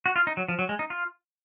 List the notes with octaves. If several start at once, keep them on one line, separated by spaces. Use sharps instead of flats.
F#4
F4
D#4
F#3
F3
F#3
G#3
D#4
F4